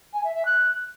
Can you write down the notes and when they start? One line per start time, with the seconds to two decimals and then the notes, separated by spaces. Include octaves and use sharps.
0.13 G#5
0.24 E5
0.34 E5
0.45 F#6